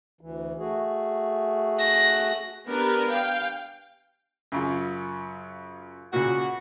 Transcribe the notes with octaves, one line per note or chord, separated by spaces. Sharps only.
D2 E3
A3 F#4 G#4
F#6 A#6
B3 D4 G4 A#4 B4
F5 G5
F#2 C#3 F4
C#2 A#2 F#4